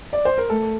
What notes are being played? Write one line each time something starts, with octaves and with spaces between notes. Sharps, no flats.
D5
C5
A#4
A3 A4